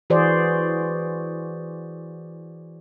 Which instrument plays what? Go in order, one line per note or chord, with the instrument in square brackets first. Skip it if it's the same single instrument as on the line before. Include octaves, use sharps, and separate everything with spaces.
[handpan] E3 F#4 G#4 C5 D5